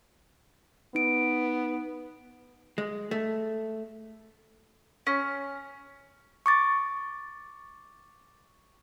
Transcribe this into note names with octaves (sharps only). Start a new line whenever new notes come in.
B3 D#4 D7
G#3
A3
C#4
C#6 D6 A6